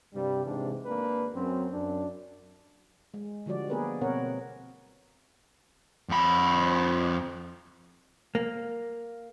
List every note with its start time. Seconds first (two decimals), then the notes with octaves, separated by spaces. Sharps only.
0.13 G2 C3 G3
0.45 G#2 C3 E3 D4
0.86 G#1 A#3 D4 B4
1.35 F#2 C4
1.73 F#2 D4
3.14 G#3
3.46 D3 F3 G3 F#4 D5
3.70 A#3 B3 G#4 A#4 B4
4.01 B2 B3 C4 A#4 C#5 F#5
6.09 F2 B5
8.35 A#3